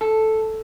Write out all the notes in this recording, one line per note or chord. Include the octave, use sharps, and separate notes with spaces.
A4